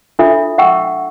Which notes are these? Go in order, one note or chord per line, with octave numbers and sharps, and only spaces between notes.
D4 F4 A4 E5
E5 F#5 G5 C#6 E6